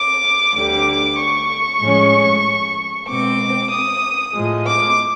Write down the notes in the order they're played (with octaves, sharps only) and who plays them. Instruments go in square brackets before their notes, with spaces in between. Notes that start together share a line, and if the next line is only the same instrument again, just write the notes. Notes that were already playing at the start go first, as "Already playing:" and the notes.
Already playing: [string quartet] D6
D2 D3 G3 D6
C#6
A2 F3 G#3 C#4
B2 G#3 C4 D6
D#6
A2 F3 G#3
D6